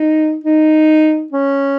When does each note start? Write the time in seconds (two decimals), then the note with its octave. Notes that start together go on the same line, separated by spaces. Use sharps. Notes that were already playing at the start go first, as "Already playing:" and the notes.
Already playing: D#4
0.44 D#4
1.33 C#4